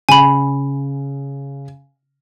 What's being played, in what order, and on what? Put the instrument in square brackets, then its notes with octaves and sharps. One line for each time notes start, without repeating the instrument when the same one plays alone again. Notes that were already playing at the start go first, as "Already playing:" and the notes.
[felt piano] C#3 [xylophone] G#5 B5